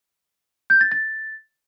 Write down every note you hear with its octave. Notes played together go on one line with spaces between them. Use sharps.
G6
A6
A6